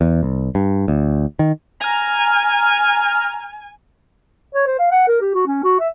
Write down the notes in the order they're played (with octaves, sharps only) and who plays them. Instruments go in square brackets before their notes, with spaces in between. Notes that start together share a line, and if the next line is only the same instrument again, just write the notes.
[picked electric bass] E2
C2
G2
D2
D#3
[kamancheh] G#5 [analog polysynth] A#5 F6
[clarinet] C#5
C5
F5
F#5
A#4
G4
F#4
C#4
F#4
E5